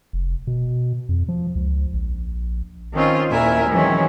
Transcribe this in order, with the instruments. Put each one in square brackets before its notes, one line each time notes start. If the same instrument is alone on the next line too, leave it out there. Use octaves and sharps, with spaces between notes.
[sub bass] F1
B2
F2
F3
C#2
A#1
[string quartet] D#3 C4 C#4 F4
D#2 A#2 E4 A#4 E5 G#5
D#3 E3 F#3 G#3 C4 C#4